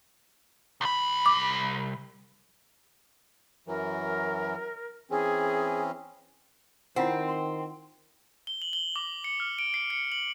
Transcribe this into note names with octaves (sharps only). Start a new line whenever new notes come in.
C2 B5
D6
F#2 E3 F#3 A#4
E3 C4 C#4 G#4
D#3 C4 E4 F4 C5 F#5
C6
G7
F#7
G7
D6
C#7
F6
D7
C7
C#7
F#7